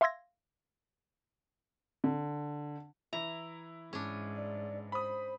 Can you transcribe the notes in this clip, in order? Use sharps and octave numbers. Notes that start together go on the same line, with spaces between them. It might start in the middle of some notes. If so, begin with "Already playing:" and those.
E5 F5 C6 E6 G#6 A#6
D3
E3 E4 A#5
G#2 C#4 D4
D5
C5 B5 D#6